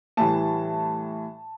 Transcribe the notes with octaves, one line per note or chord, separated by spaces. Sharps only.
A2 E3 G3 A5